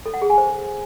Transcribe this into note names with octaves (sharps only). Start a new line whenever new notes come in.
A4
F#5
G#4
G#5
C5